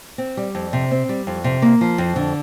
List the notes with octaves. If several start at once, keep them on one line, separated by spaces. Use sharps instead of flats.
C4
G3
F2
C3
C4
G3
F2
C3
A#3
F3
F2
D3